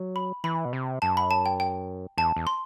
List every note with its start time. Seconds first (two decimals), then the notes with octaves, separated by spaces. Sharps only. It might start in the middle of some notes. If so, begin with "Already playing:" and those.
Already playing: F#3
0.16 B5
0.44 E3 B5
0.65 B2
0.73 C3
1.02 F#2 A5
1.17 B5
1.31 A5
1.46 G5
1.60 G5
2.17 E2 A5
2.36 E2
2.47 C6